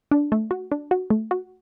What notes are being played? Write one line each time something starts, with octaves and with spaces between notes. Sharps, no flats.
D4
A3
F#4
D4
F#4
A3
F#4